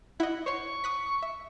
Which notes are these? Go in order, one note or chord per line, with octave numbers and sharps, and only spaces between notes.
E4 D#5 F#5
C5 C#5 C6 C#6
D#6 F#6 B6
E5